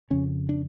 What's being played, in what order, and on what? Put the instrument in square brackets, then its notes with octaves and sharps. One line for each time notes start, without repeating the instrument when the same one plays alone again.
[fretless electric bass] F2 C#3 C#4
D4